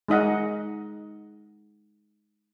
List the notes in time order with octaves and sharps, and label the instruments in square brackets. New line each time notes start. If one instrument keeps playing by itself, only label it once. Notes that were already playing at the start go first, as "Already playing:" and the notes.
[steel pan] G#3 D#4 D#5 F#5